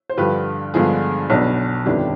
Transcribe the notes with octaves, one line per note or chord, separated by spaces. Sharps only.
C5
G2 D3 F3 G4 B4
G2 D3 F3 G#3 B3 G#4
B1 B2 B3 D4
G1 F2 D#3 B3 D4 G4